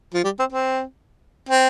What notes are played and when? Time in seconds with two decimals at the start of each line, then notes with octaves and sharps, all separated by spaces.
0.14 F3
0.24 G3
0.39 C4
0.52 C4
1.49 C4